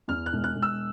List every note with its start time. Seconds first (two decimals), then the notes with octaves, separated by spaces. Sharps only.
0.08 E2 F6
0.26 F#6
0.33 E1
0.44 F#6
0.56 E1
0.62 E6